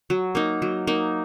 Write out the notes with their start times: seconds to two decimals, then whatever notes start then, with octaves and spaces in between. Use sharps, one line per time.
0.10 F#3
0.35 A#3 D#4
0.62 F#3
0.87 A#3 D#4